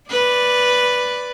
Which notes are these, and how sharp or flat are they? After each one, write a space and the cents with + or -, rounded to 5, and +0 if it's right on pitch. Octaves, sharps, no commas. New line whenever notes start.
B4 +0 D5 +0